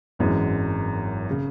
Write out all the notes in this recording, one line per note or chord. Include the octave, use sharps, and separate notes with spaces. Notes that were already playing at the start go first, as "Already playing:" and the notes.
G#1 F#2 E3 G#3
C#3